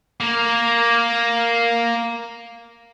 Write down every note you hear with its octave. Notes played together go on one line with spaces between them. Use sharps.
A#3 A#4